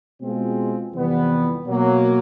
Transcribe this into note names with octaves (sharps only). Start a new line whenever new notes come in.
B2 G#3 C4 F4 G#4
F2 C3 E3 G3 B3
B2 F#3 A#3